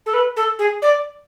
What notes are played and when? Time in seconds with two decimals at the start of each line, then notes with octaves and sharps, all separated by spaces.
0.06 A4
0.13 B4
0.36 A4
0.59 G#4
0.82 D5